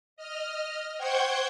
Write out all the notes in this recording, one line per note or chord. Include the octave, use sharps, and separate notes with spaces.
D#5 F6
C5 F#5 G5 C#6 G6 G#6